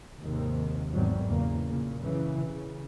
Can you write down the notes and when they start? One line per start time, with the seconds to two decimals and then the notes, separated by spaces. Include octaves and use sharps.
0.20 D#2 G#2 C3 D#3
0.91 G#1 E2 F#3 G3
1.28 E2 C#3 A#3
1.69 A#2 C#3
2.01 F#2 C#3 E3
2.48 C#3